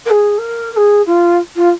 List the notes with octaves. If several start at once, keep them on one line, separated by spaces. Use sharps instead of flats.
A#4
G#4
A#4
A#4
G#4
F4
F4